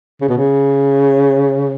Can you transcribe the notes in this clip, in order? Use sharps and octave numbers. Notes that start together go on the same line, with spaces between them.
C#3
B2
C#3